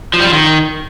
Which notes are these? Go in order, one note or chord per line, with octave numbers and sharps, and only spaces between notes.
F3
G3
F3
D#3